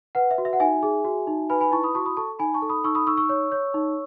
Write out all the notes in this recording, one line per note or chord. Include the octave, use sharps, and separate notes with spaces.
B4 F#5
E5
F#4
E5
F#5
D#4 E5 G#5
G#4
F#4
D#4
B4 G#5 B5
G#5 B5
E4 A5 C#6
B5 D#6
F#4 A5 C#6
B5 D#6
A4 A5 C#6
D#4 G#5 B5
A5 C#6
A4
B5 D#6
D#4 C#6 E6
B5 D#6
D#4 C#6 E6
C#6 E6
C#5
C#5
D#4